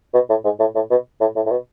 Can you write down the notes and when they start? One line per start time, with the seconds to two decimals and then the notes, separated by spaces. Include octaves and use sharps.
0.14 B2
0.29 A2
0.44 G#2
0.59 A2
0.75 A2
0.90 B2
1.20 A2
1.35 A2
1.46 A2
1.51 B2